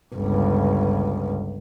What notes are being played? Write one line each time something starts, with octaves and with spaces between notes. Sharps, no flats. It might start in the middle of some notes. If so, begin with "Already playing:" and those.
G1 C#2